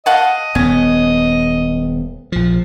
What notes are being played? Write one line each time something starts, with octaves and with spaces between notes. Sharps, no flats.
D#5 F5 F#5 A5
D#1 B3 C#4
A#1 F3